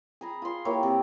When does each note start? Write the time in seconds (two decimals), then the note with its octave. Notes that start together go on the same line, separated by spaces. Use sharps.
0.21 G#4 A#5 B5
0.42 F4 C6
0.65 A#3 E4 G4 C#5
0.83 C3